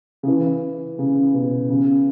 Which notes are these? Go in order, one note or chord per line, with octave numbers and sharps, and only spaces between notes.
C#3
E3
C#3
B2
C#3